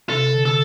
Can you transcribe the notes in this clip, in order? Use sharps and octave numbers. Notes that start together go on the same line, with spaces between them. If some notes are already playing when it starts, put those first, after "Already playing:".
C3 A4
D3
A4